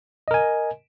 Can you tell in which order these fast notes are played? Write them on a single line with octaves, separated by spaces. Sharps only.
D#5 A#4 G#5